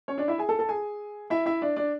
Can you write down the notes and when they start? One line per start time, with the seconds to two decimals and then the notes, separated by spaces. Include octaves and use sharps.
0.08 C#4 C#5
0.18 D4 D5
0.28 E4 E5
0.38 G#4 G#5
0.49 A4 A5
0.59 A4 A5
0.69 G#4 G#5
1.30 E4 E5
1.46 E4 E5
1.62 D4 D5
1.76 D4 D5